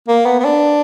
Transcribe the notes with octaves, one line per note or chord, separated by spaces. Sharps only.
A#3
B3
B3
D4